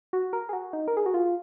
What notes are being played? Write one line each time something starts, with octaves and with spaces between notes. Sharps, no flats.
F#4
A#4
G#4
F#4
D#4
A#4
G#4
F#4
F4